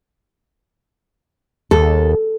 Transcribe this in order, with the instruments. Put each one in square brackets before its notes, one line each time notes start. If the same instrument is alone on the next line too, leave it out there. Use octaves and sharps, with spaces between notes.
[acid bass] D#2 [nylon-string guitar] A4